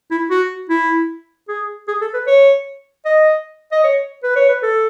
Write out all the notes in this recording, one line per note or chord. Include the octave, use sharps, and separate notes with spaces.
E4
F#4
E4
G#4
G#4
A4
B4
C#5
D#5
D#5
C#5
B4
C#5
B4
A4